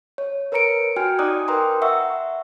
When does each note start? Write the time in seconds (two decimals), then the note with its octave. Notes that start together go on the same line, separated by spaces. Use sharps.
0.18 C#5
0.52 A#4 B4 C#5 A#5 C#7 D7
0.96 F#4 G5 G#5 F6
1.19 D#4 D5 A#5 D6 D#6 F#6
1.48 A#4 B4 G5 A#5 C6
1.82 E5 F#5 C#6 E6